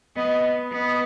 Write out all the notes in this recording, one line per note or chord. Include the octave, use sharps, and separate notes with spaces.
B3 D#5
B3 D#5